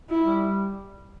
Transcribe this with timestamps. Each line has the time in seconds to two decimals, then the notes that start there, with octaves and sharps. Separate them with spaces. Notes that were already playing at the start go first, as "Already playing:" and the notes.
0.09 E4
0.23 G3